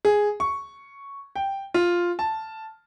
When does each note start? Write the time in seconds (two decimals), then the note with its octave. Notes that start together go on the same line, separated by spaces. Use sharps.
0.05 G#4
0.40 C#6
1.36 G5
1.74 F4
2.19 A5